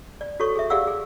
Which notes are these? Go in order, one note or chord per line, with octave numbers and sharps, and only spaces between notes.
D5
F#4 A4 C#5 C#6
G#4 E5
G4 G#4 D5 F5 F#5 E6
G#4